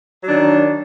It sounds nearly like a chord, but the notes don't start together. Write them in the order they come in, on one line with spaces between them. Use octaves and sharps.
F#3 D4 D#3